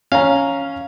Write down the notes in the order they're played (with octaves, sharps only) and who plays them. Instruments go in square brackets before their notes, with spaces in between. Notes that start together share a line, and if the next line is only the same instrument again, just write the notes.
[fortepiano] C#4 A#5 [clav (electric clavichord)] F5